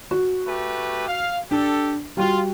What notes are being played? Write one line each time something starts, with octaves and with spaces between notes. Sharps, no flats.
F#4
A3 G4 B4
F5
D4 G4 A4
G3 F4 F#4